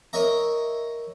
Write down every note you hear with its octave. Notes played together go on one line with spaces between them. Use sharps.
A#4 C#5 D#5 E5 A#5